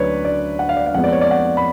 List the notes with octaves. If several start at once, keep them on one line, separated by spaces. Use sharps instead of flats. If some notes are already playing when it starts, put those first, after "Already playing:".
Already playing: D2 F#3 C#4 B4 C#5 D5
D5
F#5
F5
D5
F5
F2 F3 G#3 B3 F#5
D5
C#5
D5
F#5
B5